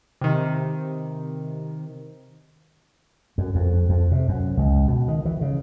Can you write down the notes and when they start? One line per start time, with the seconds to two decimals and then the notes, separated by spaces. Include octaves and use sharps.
0.21 C3 D#3
3.38 F#2
3.55 F2
3.89 F2
4.11 C3
4.28 F#2
4.57 C#2
4.88 B2
5.08 D#3
5.25 E3
5.41 C#3